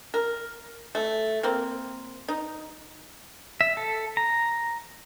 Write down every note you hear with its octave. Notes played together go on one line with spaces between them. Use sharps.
A#4
A3
A#3 C4
D#4
E5
A4
A#5